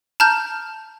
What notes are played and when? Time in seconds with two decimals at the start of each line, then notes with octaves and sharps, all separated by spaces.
0.20 A5 A#5 F6 G6